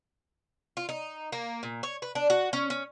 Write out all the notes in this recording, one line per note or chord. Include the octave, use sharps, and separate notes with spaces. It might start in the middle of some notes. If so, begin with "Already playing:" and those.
F4
D#4
A#3
A#2
C#5
B4
D4
F#4
C#4
C#4